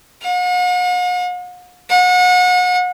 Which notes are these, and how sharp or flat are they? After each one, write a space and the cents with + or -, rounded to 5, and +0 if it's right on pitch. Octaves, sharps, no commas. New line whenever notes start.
F#5 -45
F#5 -35